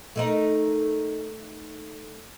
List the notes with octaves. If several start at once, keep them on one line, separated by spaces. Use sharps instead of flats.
A3 D#4 A#4